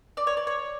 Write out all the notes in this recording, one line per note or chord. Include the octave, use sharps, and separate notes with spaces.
D5
C#5
D5
C#5